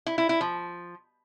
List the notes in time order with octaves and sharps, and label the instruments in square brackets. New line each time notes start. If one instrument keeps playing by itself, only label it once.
[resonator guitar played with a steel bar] E4
E4
E4
F3